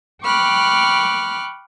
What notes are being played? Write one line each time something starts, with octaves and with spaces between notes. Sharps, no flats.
G5 B5 C#6 D6 F6 F#6